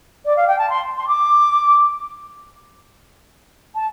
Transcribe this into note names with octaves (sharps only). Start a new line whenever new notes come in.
D5
F5
G5
A5
C6
C6
D6
A5